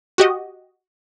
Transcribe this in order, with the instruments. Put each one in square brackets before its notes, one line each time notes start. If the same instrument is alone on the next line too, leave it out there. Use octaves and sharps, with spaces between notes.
[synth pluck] F#4 G4 D#5